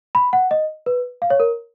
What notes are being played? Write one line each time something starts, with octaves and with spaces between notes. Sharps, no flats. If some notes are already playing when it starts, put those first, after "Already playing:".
B5
F#5
D#5
B4
F5
C#5
A#4